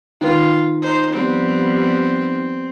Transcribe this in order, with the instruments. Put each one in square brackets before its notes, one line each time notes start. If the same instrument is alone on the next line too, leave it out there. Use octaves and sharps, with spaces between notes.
[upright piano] D#3 B4 [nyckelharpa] F4
[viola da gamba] D#4 [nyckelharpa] C5
[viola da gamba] F3 G3 B3 [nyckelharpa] C4